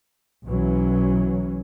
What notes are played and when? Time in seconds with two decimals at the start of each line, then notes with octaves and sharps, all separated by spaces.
0.46 B1 E3 F#3 C#4